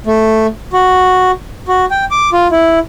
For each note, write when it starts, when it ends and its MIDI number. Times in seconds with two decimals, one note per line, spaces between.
0.06 0.47 57
0.73 1.31 66
1.68 1.85 66
1.91 2.05 79
2.11 2.30 86
2.33 2.48 65
2.51 2.79 64